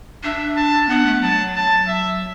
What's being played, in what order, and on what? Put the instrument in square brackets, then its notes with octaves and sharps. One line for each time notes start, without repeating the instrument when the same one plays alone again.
[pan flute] D4 [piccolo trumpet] E5
[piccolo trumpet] A5
[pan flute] B3 [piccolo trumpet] F#5
[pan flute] A3
[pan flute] F#3 [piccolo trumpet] A5
[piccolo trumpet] A5
E5